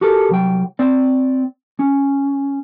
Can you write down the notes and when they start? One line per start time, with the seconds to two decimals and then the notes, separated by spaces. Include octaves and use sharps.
0.01 F#4 G4 A4 A#4
0.29 C2 F#3 G5
0.79 C4 D5
1.79 C#4